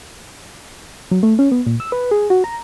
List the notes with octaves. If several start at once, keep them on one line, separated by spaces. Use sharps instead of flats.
F#3
A3
C#4
B3
A#2
E6
B4
G#4
F#4
A#5